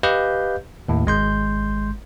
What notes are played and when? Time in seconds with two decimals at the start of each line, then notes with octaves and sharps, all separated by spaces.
0.03 G4 B4 D#5 F5 G6
0.88 D#2 A2
1.06 G#1 G#3 C6 G6